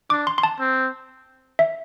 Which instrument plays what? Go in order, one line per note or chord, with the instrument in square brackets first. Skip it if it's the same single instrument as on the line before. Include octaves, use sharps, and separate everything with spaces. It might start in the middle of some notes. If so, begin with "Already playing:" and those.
[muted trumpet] D4 [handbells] D6
[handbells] C6
C6
A5
[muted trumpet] C4
[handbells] E5